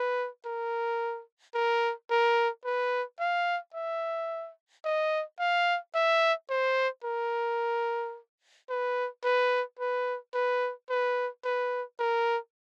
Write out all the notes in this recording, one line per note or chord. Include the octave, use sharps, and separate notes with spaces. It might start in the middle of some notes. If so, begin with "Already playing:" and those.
Already playing: B4
A#4
A#4
A#4
B4
F5
E5
D#5
F5
E5
C5
A#4
B4
B4
B4
B4
B4
B4
A#4